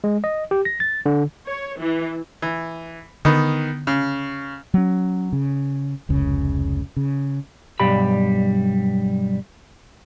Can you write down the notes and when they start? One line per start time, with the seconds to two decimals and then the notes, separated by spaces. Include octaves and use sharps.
0.04 G#3
0.24 D#5
0.51 G4
0.65 A#6
0.80 A6
1.06 D3
1.47 C#5
1.78 E3
2.42 E3
3.25 D3 D#3 B3
3.87 C#3
4.74 F#3 C#4
5.33 C#3
6.09 F1 C#2 C#3
6.96 C#3
7.80 B1 G2 G3 G4 B5